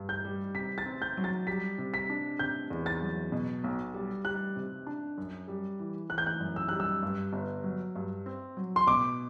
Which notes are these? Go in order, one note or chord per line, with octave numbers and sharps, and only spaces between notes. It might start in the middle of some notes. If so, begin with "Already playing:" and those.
Already playing: G2
G6
G3
C3 B6
A6
C4
G6
F#3
A6
G3 B6
C3
B6
D4
C3 G6
E2
A6
F#3
B2
B1
G3
G3 F#6
C3
D4
F#2
G3
E3
E3 F#6
G6
F#6
F#2
E6
G3 F#6
E6
G2
G1
F#3
G2
C4
F#3
C6
B2 D6